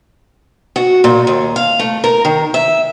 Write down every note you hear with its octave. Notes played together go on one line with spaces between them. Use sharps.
F#4
A#2
D#2
F5
A3
A#4
D#3
E5